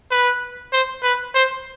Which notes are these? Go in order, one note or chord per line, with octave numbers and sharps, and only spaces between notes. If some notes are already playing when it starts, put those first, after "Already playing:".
B4
C5
B4
C5